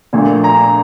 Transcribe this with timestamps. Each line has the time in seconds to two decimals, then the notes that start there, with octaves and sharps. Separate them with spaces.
0.13 A#1 A#2 A3
0.44 A#5